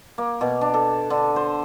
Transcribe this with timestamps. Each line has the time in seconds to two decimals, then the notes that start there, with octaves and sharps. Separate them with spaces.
0.18 A#3
0.41 B2
0.61 D4
0.74 A4
1.10 D3
1.36 C5